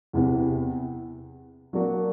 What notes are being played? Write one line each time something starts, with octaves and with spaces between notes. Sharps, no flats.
E2 C3 E3
F#3 A#3 D4 F#4 A#4